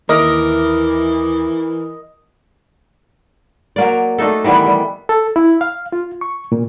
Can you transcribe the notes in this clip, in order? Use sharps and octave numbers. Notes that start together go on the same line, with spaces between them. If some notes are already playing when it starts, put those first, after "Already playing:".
D#2 E3 A#4 D#5 E5 D6
F#3 A#3 D5
A3 D4 D#4 A4
D#3 E3 G3 B3
G3
A4
E4
F5
F4
C#6
A#2